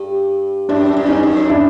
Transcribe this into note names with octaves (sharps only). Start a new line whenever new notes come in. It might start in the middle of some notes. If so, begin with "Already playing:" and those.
Already playing: G2
F#2 D4 E4
G2
C#4 D#4
F#2
D4 E4